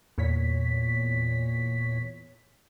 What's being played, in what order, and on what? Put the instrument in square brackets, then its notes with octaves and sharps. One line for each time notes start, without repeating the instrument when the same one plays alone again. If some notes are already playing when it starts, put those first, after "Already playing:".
[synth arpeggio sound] E2 A#2 C#5 B6